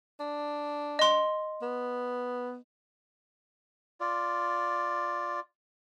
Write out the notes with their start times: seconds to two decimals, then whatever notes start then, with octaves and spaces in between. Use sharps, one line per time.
0.20 D4
0.99 D#5 C6
1.63 B3
4.00 F4 D5